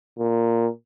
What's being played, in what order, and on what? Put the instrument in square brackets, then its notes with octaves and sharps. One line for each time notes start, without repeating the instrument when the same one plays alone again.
[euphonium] A#2